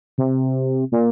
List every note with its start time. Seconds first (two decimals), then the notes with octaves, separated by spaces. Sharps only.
0.18 C3
0.92 A#2